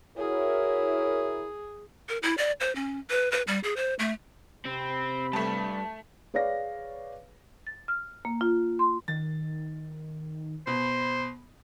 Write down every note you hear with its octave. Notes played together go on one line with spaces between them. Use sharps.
E4 F#4 G#4 A#4 C#5
A#4
E4
D5
C5
C#4
B4
B4
G3
G#4
C5
A3
C3 C4 B5
G2 A3 A5
G#4 B4 C#5 D5 F5 A#6
A6
F6
A#3
F4
C6
D#3 A6
B2 C5 B5